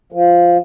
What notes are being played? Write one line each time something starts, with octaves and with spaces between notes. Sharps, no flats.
F3